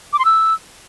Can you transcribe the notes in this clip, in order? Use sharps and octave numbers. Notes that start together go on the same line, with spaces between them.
D6
C6
E6